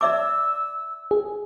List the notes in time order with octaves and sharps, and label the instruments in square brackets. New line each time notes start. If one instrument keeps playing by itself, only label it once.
[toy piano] D5 E5 D6 [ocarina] E6
[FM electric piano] G#4